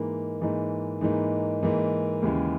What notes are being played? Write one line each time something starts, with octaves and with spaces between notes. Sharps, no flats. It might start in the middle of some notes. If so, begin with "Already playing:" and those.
Already playing: G#2 E3 A#3 D#4
G#2 E3 A#3 D#4
G#2 E3 A#3 D#4
G#2 E3 A#3 D#4
D#2 C#3 E3 G#3